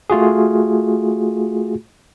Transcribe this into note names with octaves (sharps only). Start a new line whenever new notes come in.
A3 F4 F#4 G#4